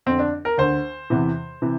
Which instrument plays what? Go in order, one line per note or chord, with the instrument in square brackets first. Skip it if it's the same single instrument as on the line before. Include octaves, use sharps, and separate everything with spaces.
[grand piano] F2 D3 C4
D4
A#4
D2 D3 C5
E2 C3 E3
C3 E3